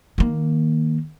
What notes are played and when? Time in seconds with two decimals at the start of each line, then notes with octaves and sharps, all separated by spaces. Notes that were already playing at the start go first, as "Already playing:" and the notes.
0.18 D#3 A#3